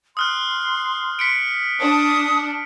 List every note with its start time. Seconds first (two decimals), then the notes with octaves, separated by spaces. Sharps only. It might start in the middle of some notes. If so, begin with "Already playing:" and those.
0.17 C6 D#6 F6 F#6
1.19 B6 C#7 D7
1.80 D4 D#6